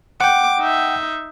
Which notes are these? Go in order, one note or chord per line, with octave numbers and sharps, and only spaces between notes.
F#5 G5 D6
D#4 E5